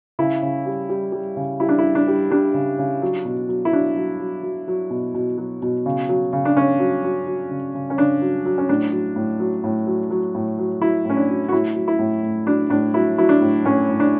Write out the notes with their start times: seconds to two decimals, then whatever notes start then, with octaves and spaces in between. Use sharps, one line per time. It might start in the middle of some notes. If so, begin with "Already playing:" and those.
0.19 C#3 E4
0.43 C#3
0.66 G3
0.89 G3
1.12 G3
1.37 C#3
1.60 G3 E4
1.69 D4
1.78 E4
1.84 G3
1.95 D4
2.08 G3
2.31 G3 D4
2.54 C#3
2.79 C#3
3.02 F#3
3.25 B2
3.49 F#3
3.65 E4
3.72 F#3 D4
3.96 F#3
4.20 F#3
4.43 F#3
4.68 F#3
4.90 B2
5.14 B2
5.38 F#3
5.62 B2
5.86 C#3
6.09 F#3
6.33 C#3
6.45 D4
6.56 C#3 C#4
6.79 F#3
7.04 F#3
7.27 F#3
7.51 C#3
7.74 C#3
7.90 C#4
7.98 C#3 D4
8.21 F#3
8.45 F#3
8.58 C#4
8.69 A2 D4
8.92 F#3
9.16 A2
9.40 F#3
9.64 A2
9.87 F#3
10.10 F#3
10.35 A2
10.58 F#3
10.81 F#3 E4
11.05 A2 C#4
11.17 D4
11.29 F#3
11.49 F#4
11.52 A2 E4
11.76 F#3
11.88 E4
11.99 A2
12.23 A2
12.46 F#3 D4
12.70 A2 D4
12.94 F#3 E4
13.18 F#3 E4
13.29 D4
13.41 A2
13.65 A2 C#4
13.89 A2
14.00 D4